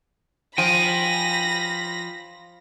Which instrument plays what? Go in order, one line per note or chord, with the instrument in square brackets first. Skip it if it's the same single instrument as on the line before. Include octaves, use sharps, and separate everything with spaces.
[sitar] F3 [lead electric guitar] G5 G#5 [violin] B5 A#6